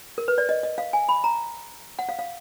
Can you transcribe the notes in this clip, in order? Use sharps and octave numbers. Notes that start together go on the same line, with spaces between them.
A#4
B4
D5
D#5
D#5
F5
G#5
B5
A#5
F#5
F5
F5